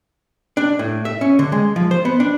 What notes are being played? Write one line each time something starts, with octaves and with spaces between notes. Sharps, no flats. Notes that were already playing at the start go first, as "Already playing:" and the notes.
D4
A2
E5
C#4
D3
G#3
F3
C5
B3
D4